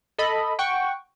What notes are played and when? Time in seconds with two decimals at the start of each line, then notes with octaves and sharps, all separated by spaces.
0.18 A4 D#5 B5
0.59 F#5 G5 C#6